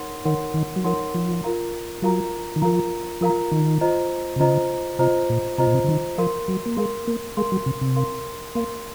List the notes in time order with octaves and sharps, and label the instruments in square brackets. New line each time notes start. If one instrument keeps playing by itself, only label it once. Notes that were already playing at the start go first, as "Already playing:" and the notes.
Already playing: [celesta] D#4 A#4 C#5 F#5 C6
[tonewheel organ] D#3 [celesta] D#4 A#4 C#5 F#5 C6
[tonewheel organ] D#3
F#3
[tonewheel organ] F3 [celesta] D#4 A#4 C#5 F#5 C6
[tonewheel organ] F3
[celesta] F4 A#4 F5 A#5
[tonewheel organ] F#3 [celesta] F4 A#4 F5 A#5
[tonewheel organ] D#3
[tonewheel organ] F3 [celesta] F4 A#4 F5 A#5
[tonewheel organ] F3 [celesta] F4 A#4 F5 A#5
[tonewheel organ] D#3
[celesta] F4 C5 D#5 A#5
[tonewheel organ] C3
[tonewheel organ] C#3 [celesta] F4 C5 D#5 A#5
[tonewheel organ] C3 [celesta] F4 C5 D#5 A#5
[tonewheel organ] A#2
[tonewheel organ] C3 [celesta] F4 C5 D#5 A#5
[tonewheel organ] A#2
C3
C#3
D#3
[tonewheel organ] F3 [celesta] A#4 F5 C6
[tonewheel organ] F#3
A#3
[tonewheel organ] G#3 [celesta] A#4 F5 C6
[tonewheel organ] A#3
[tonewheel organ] G#3 [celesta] A#4 F5 C6
[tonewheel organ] F#3
C3
C3
[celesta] A#4 F5 C6
[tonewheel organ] A#3 [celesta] A#4 F5 C6